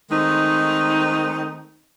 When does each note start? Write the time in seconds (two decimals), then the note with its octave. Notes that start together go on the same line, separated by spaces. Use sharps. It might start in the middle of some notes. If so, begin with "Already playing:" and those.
0.11 D#3 G#3 A3 C4 D#4